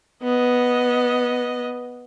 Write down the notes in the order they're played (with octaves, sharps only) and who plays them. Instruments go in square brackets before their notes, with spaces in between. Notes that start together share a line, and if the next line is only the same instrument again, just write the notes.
[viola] B3 D#5